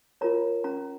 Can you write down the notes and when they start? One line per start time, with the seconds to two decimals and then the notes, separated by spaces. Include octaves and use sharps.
0.21 F4 A#4 C#5 A#5
0.64 C#4 A#5